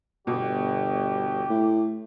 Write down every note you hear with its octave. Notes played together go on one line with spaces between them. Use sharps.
G1 B2 G4
A2